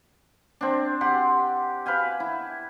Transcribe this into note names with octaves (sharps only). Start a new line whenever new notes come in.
C4 D4
G4 F#5 C6
B4 F5 G5 G#5
E4